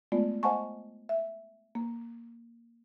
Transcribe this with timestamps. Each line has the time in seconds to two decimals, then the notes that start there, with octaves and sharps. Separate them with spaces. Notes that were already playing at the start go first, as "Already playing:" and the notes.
0.12 G#3 A3 B3 F4 D5
0.43 C5 D#5 F#5 G#5 A5 C#6
1.09 E5
1.75 A#3